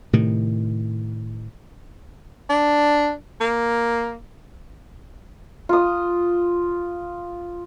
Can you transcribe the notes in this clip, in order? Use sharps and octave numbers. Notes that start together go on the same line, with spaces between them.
A2 C3 D#3
D4
A#3
F4 D#6